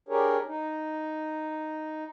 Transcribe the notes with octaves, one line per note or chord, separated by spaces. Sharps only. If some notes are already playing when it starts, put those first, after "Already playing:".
D4 G4 G#4 A#4 C#5
D#4